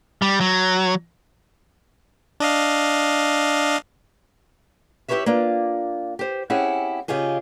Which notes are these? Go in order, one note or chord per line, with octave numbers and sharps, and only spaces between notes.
G3
F#3
D4 D#5 F5
E4 G4 A4 B4 C#5 E5
A#3 D4 F4
G4 C5
C4 C#4 E4 G4 G#4 F#5
C#3 F4 G4 G#4 D#5